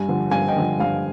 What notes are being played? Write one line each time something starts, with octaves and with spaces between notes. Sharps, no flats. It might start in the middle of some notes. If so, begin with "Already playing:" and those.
Already playing: G2 G#5
D3 F3
G2 F5 G#5
D#5 G5
D3 F3
G2 F5